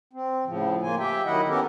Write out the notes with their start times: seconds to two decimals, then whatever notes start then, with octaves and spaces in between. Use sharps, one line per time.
0.13 C4
0.46 A2 C#3 F3
0.82 A#3 F4 G#5
0.99 G4 E5 G5
1.25 D#3 F#3 E4 D#5 F#5
1.48 B3 C#4 G4 A4 A#4